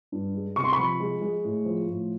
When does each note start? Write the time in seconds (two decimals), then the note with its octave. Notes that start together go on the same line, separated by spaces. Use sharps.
0.12 G2
0.35 G#3
0.56 C3 C#6
0.64 C6
0.73 B5 C#6
0.78 F3
1.00 G#3
1.22 G#3
1.44 A2
1.65 F3
1.88 A2